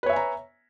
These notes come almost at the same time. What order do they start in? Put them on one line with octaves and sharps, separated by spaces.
B4 C#5 E5 G#5 A#5